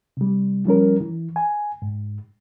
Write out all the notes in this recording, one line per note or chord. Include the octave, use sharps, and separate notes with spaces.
C3 G3
F3 G3 C#4 A#4
E3
G#5
G#2